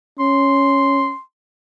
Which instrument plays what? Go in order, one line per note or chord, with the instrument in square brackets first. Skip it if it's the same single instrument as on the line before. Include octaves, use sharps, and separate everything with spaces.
[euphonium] C#4 [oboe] C6